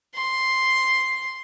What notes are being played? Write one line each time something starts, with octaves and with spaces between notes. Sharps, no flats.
C6